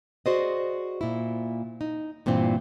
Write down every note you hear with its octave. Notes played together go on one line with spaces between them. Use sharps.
F#4 G#4 C5 D5 D#5
A#2 E4
D#4
G2 A#2 E3 C4